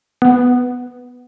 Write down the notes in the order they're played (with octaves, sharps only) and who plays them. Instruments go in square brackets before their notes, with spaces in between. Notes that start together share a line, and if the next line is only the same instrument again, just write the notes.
[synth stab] B3